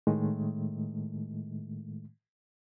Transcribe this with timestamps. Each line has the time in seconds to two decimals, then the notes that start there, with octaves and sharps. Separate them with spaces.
0.07 A2 D#3 G#3 A3